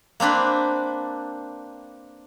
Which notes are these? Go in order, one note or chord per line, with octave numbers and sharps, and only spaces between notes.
A#3 C4 D4 B4